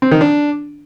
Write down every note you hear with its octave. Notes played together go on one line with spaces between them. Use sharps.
C4
D#3
D4